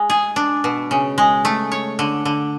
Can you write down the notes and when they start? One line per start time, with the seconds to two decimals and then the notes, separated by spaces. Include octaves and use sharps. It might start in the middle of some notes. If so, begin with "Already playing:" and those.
Already playing: G#3
0.10 G#4
0.36 D4
0.64 B2
0.91 C#3
1.18 G#3
1.45 A3
1.72 C#5
1.99 D3
2.25 D3